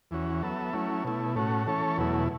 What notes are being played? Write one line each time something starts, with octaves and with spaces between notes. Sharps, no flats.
E2 E3 C#4 F#4
F#3 B3 A4 E5
F#3 A3 C#4 E4
B2 A3 E4
A2 A3 C#4 F#4
E3 A3 C#4 A4 C#5
E2 B2 F#3 A3 E4